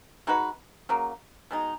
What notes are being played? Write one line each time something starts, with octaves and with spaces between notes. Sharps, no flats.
G#3 D#4 F#4 B4
C#3 F#3 A#3
B2 G#3 D#4